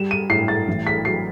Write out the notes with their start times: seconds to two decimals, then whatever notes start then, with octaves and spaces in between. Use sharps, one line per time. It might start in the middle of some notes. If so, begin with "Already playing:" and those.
Already playing: G3 E7
0.11 D#7
0.30 A2 C7
0.48 A6
0.68 A1
0.87 B6
1.05 F#3 C7